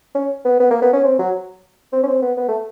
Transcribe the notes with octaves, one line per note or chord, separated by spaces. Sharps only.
C#4
B3
B3
A#3
B3
C#4
C4
F#3
C4
C#4
C4
B3
B3
A3